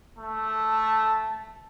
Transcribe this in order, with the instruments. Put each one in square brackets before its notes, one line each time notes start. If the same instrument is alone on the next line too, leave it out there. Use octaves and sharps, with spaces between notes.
[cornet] A3 [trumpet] A5